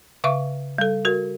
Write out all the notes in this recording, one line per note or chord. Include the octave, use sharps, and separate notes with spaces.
C#3 E5 F5 C#6
G3 A4
F#4 A#4